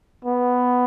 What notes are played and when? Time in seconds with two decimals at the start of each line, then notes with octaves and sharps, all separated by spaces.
0.25 B3